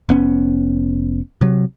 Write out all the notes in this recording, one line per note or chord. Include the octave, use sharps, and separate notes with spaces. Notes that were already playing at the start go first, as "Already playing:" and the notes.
F1 B3 C#4
C3 F#3